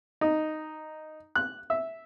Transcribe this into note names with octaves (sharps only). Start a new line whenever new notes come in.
D#4
F#6
E5